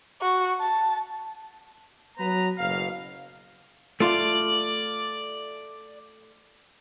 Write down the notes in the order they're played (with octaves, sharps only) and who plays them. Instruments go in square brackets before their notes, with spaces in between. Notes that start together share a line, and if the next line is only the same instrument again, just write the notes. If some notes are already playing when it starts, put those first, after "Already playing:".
[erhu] F#4
A5
[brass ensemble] F#3 B3 B4 A#5
F#1 B2 F5
[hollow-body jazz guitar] A3 F4 [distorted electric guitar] D5